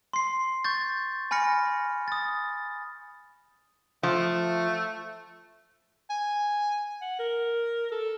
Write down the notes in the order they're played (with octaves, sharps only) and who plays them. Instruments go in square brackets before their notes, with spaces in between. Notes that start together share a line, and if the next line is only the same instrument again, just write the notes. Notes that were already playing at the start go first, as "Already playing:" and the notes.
[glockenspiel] C6 C7
C#6 G6 A6
G#5 B5 F6 A#6 C#7
D#6 A6
[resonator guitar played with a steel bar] F3 [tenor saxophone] A3
[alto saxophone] G#5
F#5
A#4
A4